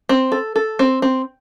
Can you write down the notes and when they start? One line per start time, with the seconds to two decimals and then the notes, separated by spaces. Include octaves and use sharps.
0.09 C4
0.32 A4
0.56 A4
0.79 C4
1.02 C4